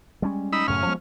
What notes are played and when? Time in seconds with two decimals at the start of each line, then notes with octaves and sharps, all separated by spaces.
0.22 G3 G#3 C#4
0.53 D#4 B5 E6
0.68 F#2 A2 C#3 C#4 F6
0.86 F3 G#3 B3